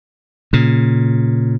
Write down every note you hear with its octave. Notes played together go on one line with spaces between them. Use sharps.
A#2 C#3